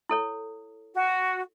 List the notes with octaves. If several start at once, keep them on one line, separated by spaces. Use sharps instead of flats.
E4 A4 C#5
F#4